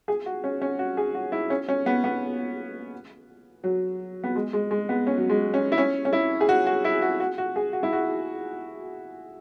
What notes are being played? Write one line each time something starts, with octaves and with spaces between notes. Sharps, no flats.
G#4
F#4
C#4
C#4
F#4
G#4
F#4
E4
C#4
C#4
B3
B3
F#3
B3
G#3
G#3
G#3
B3
C#4
F#3
G#3
C#4
E4
C#4
C#4
E4
G#4
F#4
F#4
E4
F#4
F#4
F#4
G#4
F#4
E4
F#4